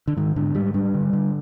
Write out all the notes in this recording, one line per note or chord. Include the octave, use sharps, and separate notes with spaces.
D3
G#2 D#3
G#2 D3
G#2 G3
G2 G3
D3
D3